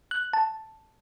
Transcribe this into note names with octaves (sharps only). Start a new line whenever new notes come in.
F#6
A5